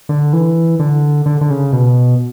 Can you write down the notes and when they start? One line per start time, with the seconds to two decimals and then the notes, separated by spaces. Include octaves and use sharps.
0.09 D3
0.33 E3
0.79 D3
1.26 D3
1.41 D3
1.50 C#3
1.73 B2